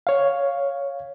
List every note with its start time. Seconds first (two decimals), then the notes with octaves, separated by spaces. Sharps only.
0.07 C#5 F5